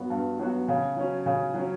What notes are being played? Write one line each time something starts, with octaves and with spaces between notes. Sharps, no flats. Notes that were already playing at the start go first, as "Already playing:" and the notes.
Already playing: G2 F#3 B3 F#4
G2
F#3 B3 F#4
C#3
F#3 C#4
C#3
F#3 C#4